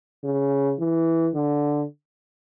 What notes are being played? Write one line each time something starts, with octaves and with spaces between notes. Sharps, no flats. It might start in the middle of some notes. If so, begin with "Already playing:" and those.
C#3
E3
D3